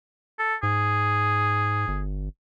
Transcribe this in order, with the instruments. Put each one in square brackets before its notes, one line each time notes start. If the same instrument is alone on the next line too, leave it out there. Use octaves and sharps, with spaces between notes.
[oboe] A4
[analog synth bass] G#2 [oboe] G#4
[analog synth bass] G1